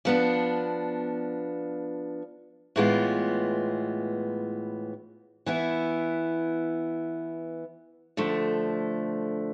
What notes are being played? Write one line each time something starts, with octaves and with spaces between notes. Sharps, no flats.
F3 B3 D4
A2 E3 G#3 B3 F4
E3 B3 E4
D3 F3 A3